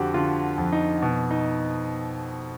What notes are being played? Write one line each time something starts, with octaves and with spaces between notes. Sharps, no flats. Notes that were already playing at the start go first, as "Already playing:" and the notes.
Already playing: F2 D3 F#4 G4 C5
D3 F4
F2
D#4
B2
D#4